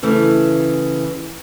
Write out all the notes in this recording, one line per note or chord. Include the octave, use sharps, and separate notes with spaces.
C#3 E3 A3 E4